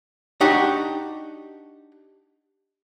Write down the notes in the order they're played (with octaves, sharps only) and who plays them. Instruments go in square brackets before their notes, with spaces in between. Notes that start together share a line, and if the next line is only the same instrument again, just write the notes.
[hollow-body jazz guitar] D4 D#4 F#4 G4 A#5